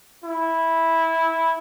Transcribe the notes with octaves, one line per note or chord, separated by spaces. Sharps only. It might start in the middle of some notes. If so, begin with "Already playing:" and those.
E4